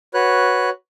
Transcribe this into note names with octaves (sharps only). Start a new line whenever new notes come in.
F#4 B4 C#5 F#6